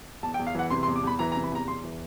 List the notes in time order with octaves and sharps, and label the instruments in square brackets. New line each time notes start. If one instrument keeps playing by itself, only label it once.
[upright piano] E2 A5
G5
E2
F5
E3 F#5
C3 C6
C6
E2
D6
E2 B5
E3 A#5
A#5
C3
B5
E2 A#5
E2 C6
E3